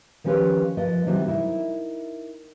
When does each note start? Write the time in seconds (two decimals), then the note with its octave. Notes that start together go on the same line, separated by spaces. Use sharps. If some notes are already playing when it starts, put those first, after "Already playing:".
0.24 D#3 F3 C#4 G4 B4 C#5
0.77 F3 A#3 B4 D#5
1.07 C3 D#3 E3 F#3 G3 A#3
1.27 D#4 E4 A#4